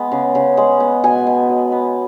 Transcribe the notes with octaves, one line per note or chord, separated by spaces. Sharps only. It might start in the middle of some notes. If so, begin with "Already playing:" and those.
Already playing: G#3 B3 D#5
C#3
C#3
G#3
B3
B2 G#5
B2
F#3
B3